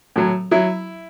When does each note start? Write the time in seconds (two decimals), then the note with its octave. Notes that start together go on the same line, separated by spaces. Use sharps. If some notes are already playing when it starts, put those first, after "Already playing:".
0.16 A2 F#3
0.51 F#3 E4